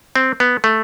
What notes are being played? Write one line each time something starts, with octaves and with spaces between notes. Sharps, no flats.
C4
B3
A3